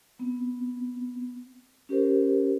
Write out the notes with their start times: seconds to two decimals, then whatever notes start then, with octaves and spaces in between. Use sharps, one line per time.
0.19 B3 C4
1.89 C#4 G4 A#4 C5